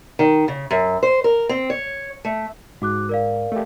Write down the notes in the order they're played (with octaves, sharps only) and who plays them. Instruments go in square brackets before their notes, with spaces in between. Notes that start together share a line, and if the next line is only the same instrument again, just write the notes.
[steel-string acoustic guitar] D#3
C#3
F#2
C5
A#4
C4
C#5
A3
[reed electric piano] G#2 [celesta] F#4 D6 F#6
[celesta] A#4 D5 F5
[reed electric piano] A3 G4